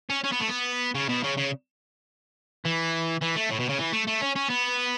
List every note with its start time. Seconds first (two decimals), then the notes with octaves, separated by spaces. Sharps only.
0.10 C#4
0.24 C#4
0.32 B3
0.40 A3
0.48 B3
0.95 C#3
1.09 B2
1.24 C#3
1.38 C#3
2.65 E3
3.22 E3
3.36 A3
3.51 A2
3.60 B2
3.69 C#3
3.79 E3
3.93 A3
4.07 A3
4.21 C#4
4.36 C#4
4.49 B3